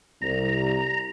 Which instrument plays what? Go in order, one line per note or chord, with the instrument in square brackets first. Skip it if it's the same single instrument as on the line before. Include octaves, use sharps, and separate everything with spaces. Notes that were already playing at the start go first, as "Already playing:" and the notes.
[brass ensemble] C2 [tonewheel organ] A#5